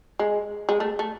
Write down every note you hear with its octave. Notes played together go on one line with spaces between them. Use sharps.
G#3
G#3
A3
A3